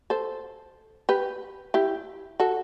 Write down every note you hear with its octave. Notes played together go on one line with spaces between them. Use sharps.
A4 C5
G4 B4
E4 G4
F#4 A4